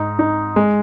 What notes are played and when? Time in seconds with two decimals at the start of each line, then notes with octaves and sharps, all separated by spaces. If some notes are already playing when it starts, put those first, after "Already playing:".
Already playing: G#2 D#4
0.19 D#4
0.56 G#3